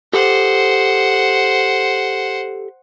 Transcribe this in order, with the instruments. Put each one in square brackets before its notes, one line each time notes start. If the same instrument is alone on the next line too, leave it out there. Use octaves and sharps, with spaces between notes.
[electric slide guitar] G4 A4 [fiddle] C5 F#5